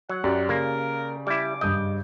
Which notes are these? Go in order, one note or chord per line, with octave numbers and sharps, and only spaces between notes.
F#3 F#5
F#2 G4 D5
C#3 A#3 A#4
G3 E4 D6
G2 D#5 G6